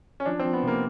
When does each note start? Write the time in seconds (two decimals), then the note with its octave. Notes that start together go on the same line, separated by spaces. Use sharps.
0.20 C#4
0.26 F3 D4
0.39 C4
0.44 F3
0.53 B3
0.63 C3 A#3